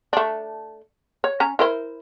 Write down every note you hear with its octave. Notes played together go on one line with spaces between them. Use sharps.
A3 D4
C#5
C#4 A#5
E4 A#4 C5